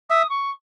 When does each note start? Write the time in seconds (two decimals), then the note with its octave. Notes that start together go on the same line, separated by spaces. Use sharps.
0.09 E5 D#6
0.29 C#6